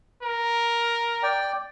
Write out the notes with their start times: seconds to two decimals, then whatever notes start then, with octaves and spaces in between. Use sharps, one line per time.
0.23 A#4
1.23 D5 G5